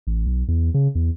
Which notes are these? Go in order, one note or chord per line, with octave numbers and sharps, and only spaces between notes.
A1
B1
E2
C#3
E2